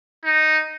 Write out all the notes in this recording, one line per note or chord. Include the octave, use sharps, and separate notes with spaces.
D#4